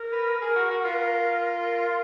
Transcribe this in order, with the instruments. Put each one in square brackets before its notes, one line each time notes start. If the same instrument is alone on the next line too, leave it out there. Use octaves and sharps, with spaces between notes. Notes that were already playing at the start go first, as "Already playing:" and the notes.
Already playing: [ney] A#4
[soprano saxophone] B4
[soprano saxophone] G#4 [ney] A#4
[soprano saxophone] F#4
F#4
F4
[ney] B4
A#4
A#4